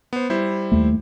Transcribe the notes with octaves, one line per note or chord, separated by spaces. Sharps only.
B3 C5
G3 E4 C5
D#2 A3